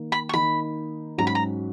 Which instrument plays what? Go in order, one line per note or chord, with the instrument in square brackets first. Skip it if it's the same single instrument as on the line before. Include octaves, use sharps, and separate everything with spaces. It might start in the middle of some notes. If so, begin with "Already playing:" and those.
Already playing: [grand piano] D#3 A#3
[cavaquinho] B5
C#6
[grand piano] D#3 A#3 D#4 [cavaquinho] B5
[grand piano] G#2 F#3 C#4 F#4 [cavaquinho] A#5
[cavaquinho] B5
A#5